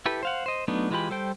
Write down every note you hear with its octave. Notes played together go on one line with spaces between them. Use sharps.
E4 G4 A4 B4
C5 F5 F#5
C5 D#5
F#3 A3 B3 D4 D#4
E3 G#3 F4 G4 B5
G3 A4 C5 G5